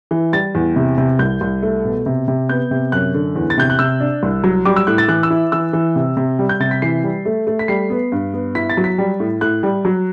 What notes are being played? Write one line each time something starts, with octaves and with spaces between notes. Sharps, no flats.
E3
G3 A6
E2
C3
C3
C2 G6
C2
A3
B2
C3
C3
B3 G6
C3
F#2 F#6
D3
E2
A6
C3 G6
F#6
C3 E6
D4
C2
F#3
G3 D6
E6
A2 F#6
A6
E3 F#6
E6
E4
E3 E6
E3
C3
C3
G3
G6
C3 A6
B6
E3 C7
G3
A3
A3
B6
G3 C7
B3
G2
B3
E4 B6
A6
F#3
B6
G3
A2
A2 F#6
G3
F#3